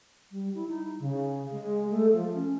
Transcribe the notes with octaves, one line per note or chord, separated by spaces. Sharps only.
G3
E4
D#4
C#3
G#3
A3
F3
C#4